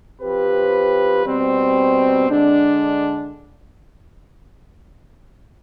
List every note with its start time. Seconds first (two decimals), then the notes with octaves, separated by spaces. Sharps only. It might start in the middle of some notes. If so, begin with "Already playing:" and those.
0.21 F3 C4 G4 B4
1.24 B2 G3 C4
2.29 D3 G#3 D4